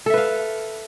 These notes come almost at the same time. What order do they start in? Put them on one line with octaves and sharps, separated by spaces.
A4 E5 B4 F5